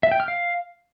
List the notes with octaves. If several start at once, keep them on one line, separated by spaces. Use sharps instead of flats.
E5
G5
F6
F5